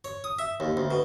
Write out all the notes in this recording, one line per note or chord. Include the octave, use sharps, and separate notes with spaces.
C#5
D#6
E5
D#2
D2
B2